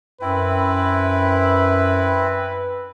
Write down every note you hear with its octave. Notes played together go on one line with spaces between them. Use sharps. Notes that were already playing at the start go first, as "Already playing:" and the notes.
F#2 C4 E4 B4